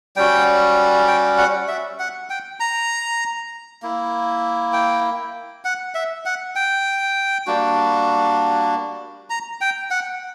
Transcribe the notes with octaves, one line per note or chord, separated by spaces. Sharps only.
G3 C#4 F#4 G5
G5
F#5
E5
F#5
G5
A#5
A#3 E4
G5
F#5
E5
F#5
G5
G3 A#3 D4 F#4
A#5
G5
F#5